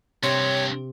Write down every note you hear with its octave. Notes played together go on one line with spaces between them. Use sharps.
G2 C3 C4 C#5